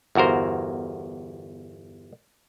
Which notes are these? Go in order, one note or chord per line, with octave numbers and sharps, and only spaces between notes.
G1 E2 F#4 A#4 C5